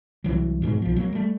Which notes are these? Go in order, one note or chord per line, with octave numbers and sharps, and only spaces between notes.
C2 F2 E3 F#3
G#2 B2 D3 G#3
B1 F3
F#3 A3 A#3
G3 A3